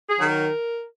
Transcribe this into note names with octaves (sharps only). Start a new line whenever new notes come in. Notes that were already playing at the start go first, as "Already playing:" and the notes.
G#4
D#3 F#3
A#4